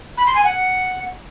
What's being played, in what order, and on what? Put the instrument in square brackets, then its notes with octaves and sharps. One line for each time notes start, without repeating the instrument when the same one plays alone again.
[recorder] B5
C6
G#5
F#5